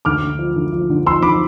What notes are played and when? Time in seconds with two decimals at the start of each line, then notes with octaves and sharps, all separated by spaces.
0.05 D2 D6 F6
0.22 D3
0.39 F3
0.56 D2
0.73 F3
0.90 D3
1.06 F3 C6 E6
1.22 D3 B5 D6